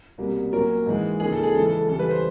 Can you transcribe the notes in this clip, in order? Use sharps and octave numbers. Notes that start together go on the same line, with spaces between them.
C2 B2 G3 A#3
A#2 F#3 A#3 C#4 A#4
G#2 E3 G#3
C#3 F3 A#3 D#4 G#4
A4
G#4
C#3 E3 G#3 A4
A4
C#3 E3 G3 A4
B4
C5